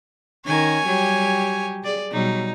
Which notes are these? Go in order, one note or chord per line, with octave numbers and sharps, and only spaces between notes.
D#3 C#4 A#4 C#5 G#5
F#3 G3 G4
G#4 D5
B2 F#3 G3 D#4